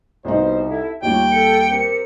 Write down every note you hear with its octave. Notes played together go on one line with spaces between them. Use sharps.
C2 B2 D#4 C5
E4 A4
D#2 G3 F4 C#5 G5
A4 C#7
C4 G4 A#4